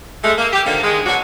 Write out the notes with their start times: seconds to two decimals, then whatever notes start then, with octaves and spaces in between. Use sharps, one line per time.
0.24 G#3 A3
0.38 A#3
0.53 G4
0.66 D3 D#3 F3 A#3
0.83 D#3 G#3
1.06 B2 F#3 D4 F#4